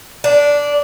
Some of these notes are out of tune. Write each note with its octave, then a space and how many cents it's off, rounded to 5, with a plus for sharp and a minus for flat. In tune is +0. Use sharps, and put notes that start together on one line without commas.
D4 -10